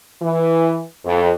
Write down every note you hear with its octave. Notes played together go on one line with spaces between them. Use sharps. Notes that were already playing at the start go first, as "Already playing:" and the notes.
E3
F2